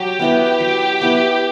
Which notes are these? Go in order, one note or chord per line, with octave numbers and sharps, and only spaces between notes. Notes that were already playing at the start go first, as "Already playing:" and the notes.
Already playing: F#3 G4
B3 E4 B4
F#3
B3 E4 B4